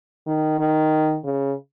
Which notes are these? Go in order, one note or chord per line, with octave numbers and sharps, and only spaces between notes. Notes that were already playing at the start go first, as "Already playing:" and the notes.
D#3
D#3
C#3